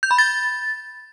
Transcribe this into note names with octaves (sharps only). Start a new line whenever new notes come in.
G6
B5
A6